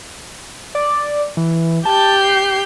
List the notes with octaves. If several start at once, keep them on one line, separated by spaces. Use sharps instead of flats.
D5
E3
G4 A5 G6
C7